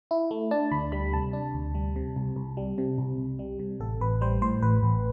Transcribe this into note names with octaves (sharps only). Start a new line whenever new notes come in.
E4
A3
D4 A5
D2 B5
G3 B5
C3 A5
D4
D2
G3
C3
C2
C2
G3
C3
C2
C2
G3
C3
A1 A4
A1 B4
G3 C5
A2 C5
A1 B4
A1